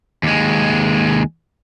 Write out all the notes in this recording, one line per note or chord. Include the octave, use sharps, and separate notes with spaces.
D#2 G#3